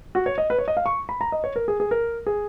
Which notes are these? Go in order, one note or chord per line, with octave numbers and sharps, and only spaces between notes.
F#4
C#5
D#5
B4
C#5
D#5
F5
C#6
B5
A#5
D#5
C#5
A#4
G#4
G#4
A#4
G#4